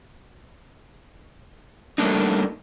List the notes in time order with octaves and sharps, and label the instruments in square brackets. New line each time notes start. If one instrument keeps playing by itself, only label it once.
[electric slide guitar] G3 A3 A#3 D4 D#4